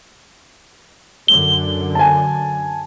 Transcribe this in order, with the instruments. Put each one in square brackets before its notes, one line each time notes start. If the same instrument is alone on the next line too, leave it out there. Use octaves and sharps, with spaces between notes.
[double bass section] F#2 D3 [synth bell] G7
[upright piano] G#5 A5